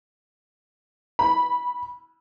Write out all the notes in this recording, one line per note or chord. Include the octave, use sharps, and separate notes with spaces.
B5